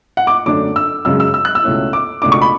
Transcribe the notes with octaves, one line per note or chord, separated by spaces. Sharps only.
F#5
D6
F#2 D3 A3 D4 D6
E6
F#2 C#3 G#3 E6
E6
E6
F#6
E6
C#2 B2 A3 C#4 E4
D6
C#2 B2 A3 D4 D6
C#6
B5